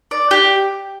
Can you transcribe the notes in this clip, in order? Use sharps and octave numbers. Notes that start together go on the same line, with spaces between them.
D5
G4